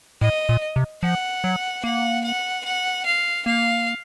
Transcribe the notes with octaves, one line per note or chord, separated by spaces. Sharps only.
A2 D#5
A#2
C3
F3 F#5
F#3
A#3 F#5
F#5
F#5
F5
A#3 F5